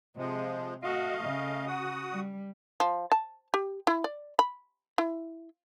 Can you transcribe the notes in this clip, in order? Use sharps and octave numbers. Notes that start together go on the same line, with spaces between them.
C3 F3 G#3
A3 F#4 D#5 F5
C#3
F#4 F#5 D#6
G3
F3
A5
G4
E4
D5
B5
E4